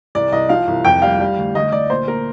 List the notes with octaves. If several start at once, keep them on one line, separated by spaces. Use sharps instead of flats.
C2 D5
C2 D#5
F3 F5
C2
F2 G5
G3 F5
G3
D2
D2 D#5
D2 D5
A#2 C5
A#3 A#4